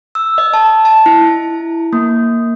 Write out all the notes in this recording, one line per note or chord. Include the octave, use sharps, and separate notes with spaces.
E6
D#5
A5
A5
E4
A#3